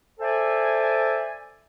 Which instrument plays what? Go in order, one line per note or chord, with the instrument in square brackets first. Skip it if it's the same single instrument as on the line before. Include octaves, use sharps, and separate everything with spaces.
[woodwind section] A4 C5 D5 E5 G#5